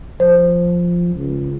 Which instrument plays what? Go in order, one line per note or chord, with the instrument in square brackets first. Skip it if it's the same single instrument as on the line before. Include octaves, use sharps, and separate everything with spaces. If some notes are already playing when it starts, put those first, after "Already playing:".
[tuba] F3 [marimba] C5
[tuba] C#2